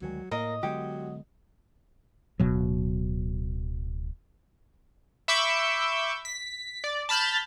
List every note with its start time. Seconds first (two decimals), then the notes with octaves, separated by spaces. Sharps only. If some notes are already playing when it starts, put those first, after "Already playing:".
0.02 D2 D#3 F#3 G#3
0.31 A2 A#3 A#4 D#5
0.63 D3 F#3 G#3 B3 G4
2.40 D1 B2 F#3
5.28 E5 B5 C#6 D6 E6 G6
6.25 B6
6.84 D5
7.09 A5 B5 F6 G6 A6